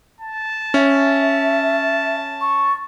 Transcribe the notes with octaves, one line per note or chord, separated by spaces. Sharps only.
A5
C#4 E5
C#6